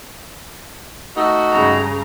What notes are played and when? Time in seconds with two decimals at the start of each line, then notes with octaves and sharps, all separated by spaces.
1.17 A3 D#4 F#4
1.52 G2 C#3 A#5